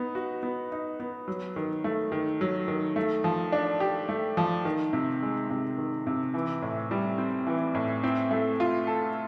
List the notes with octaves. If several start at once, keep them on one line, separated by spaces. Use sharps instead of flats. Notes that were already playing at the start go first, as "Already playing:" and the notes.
Already playing: B3 D#4
F#4
B3
D#4
B3
F#3
D#3
A3
D#3
F#3
D#3
A3
F3
D4
G4
A3
F3
D#3
C3
G#3
C3
D#3
C3
E3
A2
G3
C4
E3
A2
C4
A3
F4
A4